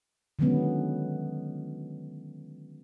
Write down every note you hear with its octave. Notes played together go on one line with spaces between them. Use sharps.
D3 D#3 F#3 G#3 B3 C#4